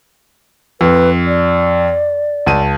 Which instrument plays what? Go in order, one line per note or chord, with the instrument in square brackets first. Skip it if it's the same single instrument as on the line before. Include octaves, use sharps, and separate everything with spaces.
[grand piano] F2 [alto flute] B4
[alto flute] D5
[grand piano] C#2 A5 D#7